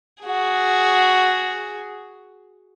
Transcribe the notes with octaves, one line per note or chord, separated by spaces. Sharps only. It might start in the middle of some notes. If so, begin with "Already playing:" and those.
F#4 G#4